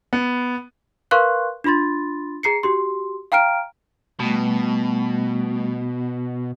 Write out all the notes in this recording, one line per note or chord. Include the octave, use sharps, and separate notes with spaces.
B3
A#4 B4 F5 C6 C#6 F#6
D4 F4 B5 C6 A6
G#4 A#5 C7 C#7
F#4 G4 C6
F5 G5 A#5 F6 D7
B2 G3 A3